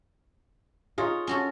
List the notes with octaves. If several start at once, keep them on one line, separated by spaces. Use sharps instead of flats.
D#4 F4 G#4 C#5
C#4 F#4 A4